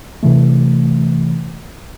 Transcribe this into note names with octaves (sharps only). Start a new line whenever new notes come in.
C3 E3 A3